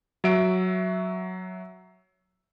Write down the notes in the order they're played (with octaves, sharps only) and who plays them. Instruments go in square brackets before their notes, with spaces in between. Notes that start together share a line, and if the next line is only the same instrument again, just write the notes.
[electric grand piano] F#3 F#4 E5 D7